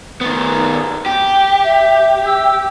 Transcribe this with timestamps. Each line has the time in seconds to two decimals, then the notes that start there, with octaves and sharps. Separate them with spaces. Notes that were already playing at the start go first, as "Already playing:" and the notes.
0.21 D#3 B3
1.06 G4
1.63 E5
2.26 E6